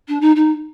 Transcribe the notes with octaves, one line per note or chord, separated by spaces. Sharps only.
D4
D#4
D#4